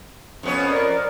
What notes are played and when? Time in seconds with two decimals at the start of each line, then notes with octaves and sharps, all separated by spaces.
0.43 F2 B3 C#4 C#5
0.70 A#4 D5